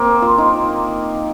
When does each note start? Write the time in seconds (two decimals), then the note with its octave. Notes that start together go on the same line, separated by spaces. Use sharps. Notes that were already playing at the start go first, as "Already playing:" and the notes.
Already playing: A#3 C4
0.22 F4
0.38 D#4